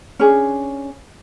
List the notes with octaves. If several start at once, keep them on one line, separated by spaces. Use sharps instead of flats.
C#4 D4 G#4